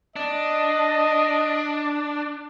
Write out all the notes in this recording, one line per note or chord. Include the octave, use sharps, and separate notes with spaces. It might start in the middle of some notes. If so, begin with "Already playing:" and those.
D4 D#5